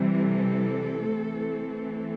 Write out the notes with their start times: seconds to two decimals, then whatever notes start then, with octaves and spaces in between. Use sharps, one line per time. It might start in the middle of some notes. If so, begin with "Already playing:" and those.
Already playing: C3 E3 G3 C4
0.22 A4
1.08 E3 A3 C4